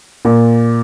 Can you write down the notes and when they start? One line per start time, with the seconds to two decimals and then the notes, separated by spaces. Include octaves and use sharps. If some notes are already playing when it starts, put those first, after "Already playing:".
0.25 A#2